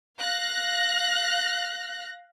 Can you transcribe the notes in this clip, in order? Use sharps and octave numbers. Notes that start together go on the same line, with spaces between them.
F5 F#6 A#6